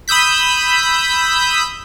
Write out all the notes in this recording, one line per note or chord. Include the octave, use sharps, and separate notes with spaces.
B5 D#6 E6 G6 B6